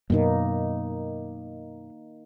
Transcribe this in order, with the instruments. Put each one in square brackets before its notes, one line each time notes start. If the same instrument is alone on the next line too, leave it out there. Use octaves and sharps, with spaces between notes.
[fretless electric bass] F#2 B2 [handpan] A#3 D#4